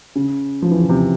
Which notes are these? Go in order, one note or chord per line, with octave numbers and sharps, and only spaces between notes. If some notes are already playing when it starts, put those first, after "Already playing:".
C#3
F3
E3
C#3
C3